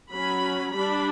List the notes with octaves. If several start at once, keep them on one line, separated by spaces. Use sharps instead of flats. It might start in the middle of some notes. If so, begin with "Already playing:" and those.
F#3 C#4 B5
G3 D4 B5